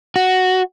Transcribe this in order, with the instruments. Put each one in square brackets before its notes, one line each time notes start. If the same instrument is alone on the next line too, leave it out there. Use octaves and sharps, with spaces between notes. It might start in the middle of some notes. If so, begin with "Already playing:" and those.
[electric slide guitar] F#4